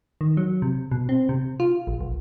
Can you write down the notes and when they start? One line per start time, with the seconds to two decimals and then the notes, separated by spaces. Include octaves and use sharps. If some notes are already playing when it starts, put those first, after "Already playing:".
0.21 D#3
0.37 F#3
0.62 C3
0.92 B2
1.09 C4
1.29 C3
1.60 F4
1.87 A#1
2.01 B1